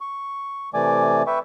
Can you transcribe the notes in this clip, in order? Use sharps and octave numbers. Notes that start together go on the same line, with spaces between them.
C#6
C3 E3 A3 D5 G#5 D6
B4 E5 G5 C#6